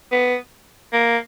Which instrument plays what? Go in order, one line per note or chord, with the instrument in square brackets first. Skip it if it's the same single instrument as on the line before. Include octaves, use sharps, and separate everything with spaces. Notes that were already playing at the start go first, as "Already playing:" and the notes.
[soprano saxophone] B3
A#3